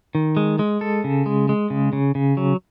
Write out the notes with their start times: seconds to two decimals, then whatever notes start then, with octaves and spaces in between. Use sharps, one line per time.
0.15 D#3
0.37 G#3
0.59 G#3
0.81 A4
1.04 C#3
1.26 G#3
1.49 G#3
1.70 C#3
1.93 C#3
2.15 C#3
2.37 F#3